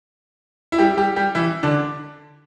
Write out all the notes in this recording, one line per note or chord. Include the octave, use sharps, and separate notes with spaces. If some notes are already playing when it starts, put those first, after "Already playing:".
E4
G3 G4
G3 G4
G3 G4
E3 E4
D3 D4